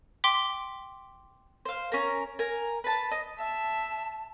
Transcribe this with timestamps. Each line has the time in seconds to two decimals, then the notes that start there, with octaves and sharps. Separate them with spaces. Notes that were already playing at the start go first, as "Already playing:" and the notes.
0.24 G5 C6 D6 B6
1.65 C5 F5
1.92 C#4 A#4
2.39 A#4 G#5
2.84 B4 A5
3.11 D#5
3.38 E5 A5